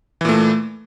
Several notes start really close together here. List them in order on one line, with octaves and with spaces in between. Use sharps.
E3 A#2 A3